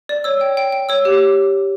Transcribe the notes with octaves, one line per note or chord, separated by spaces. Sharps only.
D5
C#5 E6
G5
G5
G5
C#5 E6
G4